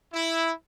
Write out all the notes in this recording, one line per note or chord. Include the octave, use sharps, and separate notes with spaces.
E4